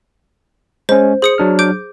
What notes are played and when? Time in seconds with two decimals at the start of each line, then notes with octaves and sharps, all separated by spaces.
0.89 G#3 C#4 C5
1.22 G#4 C5 D#6 C#7
1.38 F#3 D4 F6
1.59 D6 G6 D7